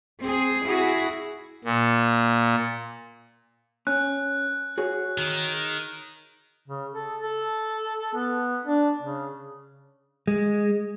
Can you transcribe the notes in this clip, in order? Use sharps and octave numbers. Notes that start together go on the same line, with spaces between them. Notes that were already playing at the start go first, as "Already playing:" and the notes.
C4 G#4
E4 F#4 G#4
A#2
C#4 F#6
F#4 G#4 C#5
D#3
C#3
A4
A4
B3
D4
C#3
G#3